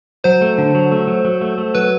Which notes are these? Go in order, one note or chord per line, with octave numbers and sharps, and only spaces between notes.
F#3 C5
A3
D3
F#3
A3
F#3
F#3
A3
A3
F#3 B4